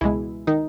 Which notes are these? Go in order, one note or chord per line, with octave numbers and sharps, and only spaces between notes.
C#2 B2 E3 G#3 E4
D#3 D#4